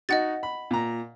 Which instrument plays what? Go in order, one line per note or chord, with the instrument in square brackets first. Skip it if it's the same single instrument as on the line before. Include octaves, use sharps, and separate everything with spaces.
[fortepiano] D#4 F#4 [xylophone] D#5 F#5 A6
[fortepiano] B5
A#2 A#5